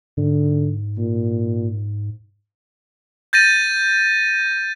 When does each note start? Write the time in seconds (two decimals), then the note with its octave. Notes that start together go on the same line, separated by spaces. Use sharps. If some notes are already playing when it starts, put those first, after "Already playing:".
0.17 G#2 D3
0.97 A#2
3.33 G6 A6 A#6 D#7